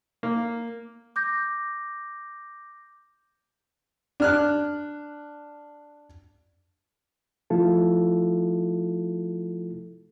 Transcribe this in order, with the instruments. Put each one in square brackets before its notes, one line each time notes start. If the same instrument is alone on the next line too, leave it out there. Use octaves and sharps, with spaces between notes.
[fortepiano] A#3
[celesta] D6 G6 A#6
[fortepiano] D4 F6 F#6
[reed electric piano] F3 A3 E4 F4 A4